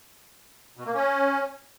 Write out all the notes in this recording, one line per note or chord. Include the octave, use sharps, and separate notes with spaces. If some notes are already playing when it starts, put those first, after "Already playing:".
B2
A#3
C#4